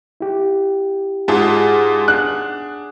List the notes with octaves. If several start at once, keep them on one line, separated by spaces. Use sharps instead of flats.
E4 G4
G#2 F4 G#4 F#5 A5
D4 F#6